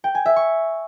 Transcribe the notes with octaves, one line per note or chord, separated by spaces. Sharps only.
G5
G#5
E5
C#6